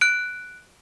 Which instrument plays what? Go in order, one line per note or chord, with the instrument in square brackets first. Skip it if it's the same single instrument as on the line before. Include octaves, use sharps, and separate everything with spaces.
[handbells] F#6 D7